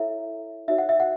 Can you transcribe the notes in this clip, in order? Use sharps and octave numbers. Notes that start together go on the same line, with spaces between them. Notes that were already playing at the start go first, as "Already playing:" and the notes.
Already playing: E4 A4 C#5 E5
D#4 F#4 C#5 E5
F#5
E5
F#5